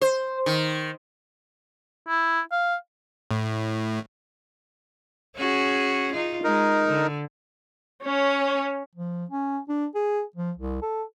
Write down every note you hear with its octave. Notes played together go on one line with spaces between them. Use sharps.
C5
D#3
E4
F5
A2
C#4 F#4 G#4
D#4 F4
G#3 D#4 A#4
D3
C#4 C#5
F3
C#4
D4
G#4
F3
C2
A4